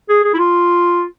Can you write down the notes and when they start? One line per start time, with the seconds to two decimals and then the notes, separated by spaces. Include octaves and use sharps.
0.09 G#4
0.24 G#4
0.34 E4
0.38 F4